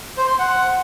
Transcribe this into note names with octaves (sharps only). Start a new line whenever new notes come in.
C5
C6
F#5